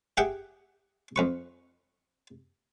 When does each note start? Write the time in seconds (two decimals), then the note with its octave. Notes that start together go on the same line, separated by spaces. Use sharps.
0.17 G4 G#4 E5 F#5 G5
1.16 F2 B4 C#6